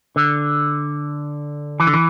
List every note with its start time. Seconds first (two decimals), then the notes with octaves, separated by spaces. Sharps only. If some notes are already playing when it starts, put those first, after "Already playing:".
0.16 D3
1.80 E3
1.87 D3
1.94 E3